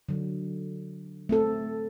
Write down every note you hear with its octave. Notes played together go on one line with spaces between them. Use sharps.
D3 F#3
A3 C4 A4